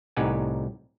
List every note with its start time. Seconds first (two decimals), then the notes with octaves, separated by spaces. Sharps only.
0.17 C2 A2 D#4 G4 F#5 G#5